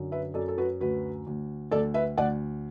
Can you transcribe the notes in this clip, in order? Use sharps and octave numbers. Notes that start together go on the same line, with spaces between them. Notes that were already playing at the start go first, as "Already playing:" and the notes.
Already playing: F#2 D3
B4 E5
F#2 A4 D5
A4
F#4 B4
D2 F#4 B4
D2
D2 A4 D5
B4 E5
D2 D5 F#5